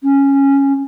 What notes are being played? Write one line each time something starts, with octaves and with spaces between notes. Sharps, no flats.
C#4